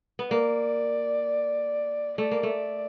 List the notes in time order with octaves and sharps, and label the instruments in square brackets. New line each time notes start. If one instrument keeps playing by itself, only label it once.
[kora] B3
[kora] A#3 [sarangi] D5
[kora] A3 [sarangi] D5
[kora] A#3
A3
[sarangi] D5